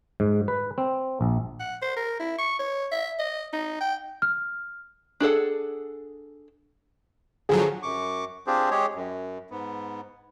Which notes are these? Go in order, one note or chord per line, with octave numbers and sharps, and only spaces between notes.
G#2
B4
C4
A#1
F#5
C5
A#4
E4
C#6
C#5
E5
D#5
D#4
G5
F6
D4 G#4 A4 F#5
D3 F3 F#3 G#4
F#2 C#6 D6
C4 D4 F4 G4 G#4 C5
G#3 G4 G#4 C#5
F#2
G#2 B3